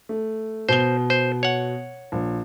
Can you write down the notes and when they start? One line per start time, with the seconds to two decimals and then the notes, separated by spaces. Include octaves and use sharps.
0.09 A3
0.69 B2 C5 G7
1.10 C5
1.43 C#5 F#5
2.12 A#1